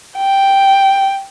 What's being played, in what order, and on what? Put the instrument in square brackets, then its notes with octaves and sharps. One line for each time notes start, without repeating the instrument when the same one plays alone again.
[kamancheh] G5